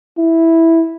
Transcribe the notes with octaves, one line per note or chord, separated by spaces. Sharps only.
E4